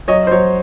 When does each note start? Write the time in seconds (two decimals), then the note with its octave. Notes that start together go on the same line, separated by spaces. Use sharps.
0.08 F#3 C#5 D#5
0.27 C5
0.31 F#3 C#5